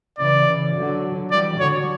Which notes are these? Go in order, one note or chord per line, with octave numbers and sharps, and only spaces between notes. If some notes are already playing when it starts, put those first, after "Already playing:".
C#3 E3 D5
C#3 E3
D3 F#3
E3 G3 D5
D3 F#3 C#5